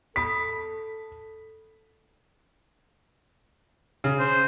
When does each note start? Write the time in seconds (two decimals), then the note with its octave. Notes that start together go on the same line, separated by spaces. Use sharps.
0.16 A4 B5 D#6 B6
4.04 C#3
4.20 C5